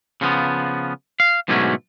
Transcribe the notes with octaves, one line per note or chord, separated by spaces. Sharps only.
C#3 F3 B3
F5
G#2 B2 D3 F#3 A3 C#4